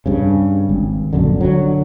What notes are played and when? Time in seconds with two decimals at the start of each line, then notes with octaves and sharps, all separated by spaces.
0.06 G2 C#3
0.69 G#1
1.13 A#1 F#2 D3
1.41 D3 F#3